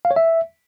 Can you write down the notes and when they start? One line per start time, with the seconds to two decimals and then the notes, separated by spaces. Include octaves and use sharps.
0.05 F5
0.11 C#5
0.16 E5